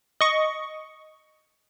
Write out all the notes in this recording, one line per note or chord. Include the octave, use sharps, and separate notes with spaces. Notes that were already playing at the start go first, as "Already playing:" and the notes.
D#5 C#6